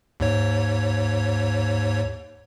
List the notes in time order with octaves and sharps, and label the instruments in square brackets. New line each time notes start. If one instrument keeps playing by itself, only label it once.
[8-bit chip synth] D#2 G#2 C#5